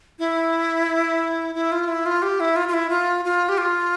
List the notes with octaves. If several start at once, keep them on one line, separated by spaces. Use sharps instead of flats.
E4
E4
F4
E4
F4
G4
E4
F4
F4
E4
F4
F4
G4
F4